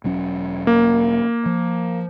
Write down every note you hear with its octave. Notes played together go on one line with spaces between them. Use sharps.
E1 F#3 C#4
A#3
F3